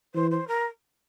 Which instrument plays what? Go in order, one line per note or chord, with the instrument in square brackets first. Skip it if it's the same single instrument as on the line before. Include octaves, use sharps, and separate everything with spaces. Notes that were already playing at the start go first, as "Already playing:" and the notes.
[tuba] E3 [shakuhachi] C5
[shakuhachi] C5
A#4